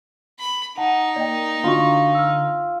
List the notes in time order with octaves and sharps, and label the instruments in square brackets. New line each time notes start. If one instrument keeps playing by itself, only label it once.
[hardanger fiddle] B5
[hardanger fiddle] D#4 [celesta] F#5 A5
[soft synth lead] A#3 [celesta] D5 D#5 G5
[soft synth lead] D3 [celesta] D4 F#4 C#6 [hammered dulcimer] F4
[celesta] E6 F6